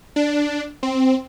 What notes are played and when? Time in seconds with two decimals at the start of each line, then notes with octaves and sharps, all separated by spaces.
0.16 D4
0.83 C4